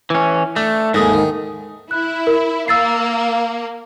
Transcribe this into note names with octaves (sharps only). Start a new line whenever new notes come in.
E3 C#4
A3 D4
D#2 G#2 G#3 A3
D#3
E4 F#6
A#4
A#3 E6 A6 C7